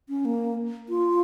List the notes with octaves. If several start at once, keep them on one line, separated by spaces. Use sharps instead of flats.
C#4
A#3
F4